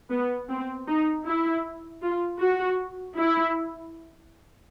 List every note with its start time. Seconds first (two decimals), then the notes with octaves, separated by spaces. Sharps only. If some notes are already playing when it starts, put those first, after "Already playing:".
0.11 B3
0.49 C4
0.87 D#4
1.26 E4
2.03 F4
2.41 F#4
3.17 E4